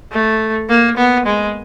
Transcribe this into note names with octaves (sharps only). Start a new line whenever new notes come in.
A3
A#3
B3
G#3